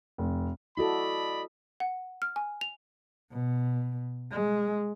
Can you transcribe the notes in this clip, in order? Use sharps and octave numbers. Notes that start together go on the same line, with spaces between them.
F1
E4 F#4 A4 D5 D#5 B5
F#5
F6
G#5
F7
B2
G#3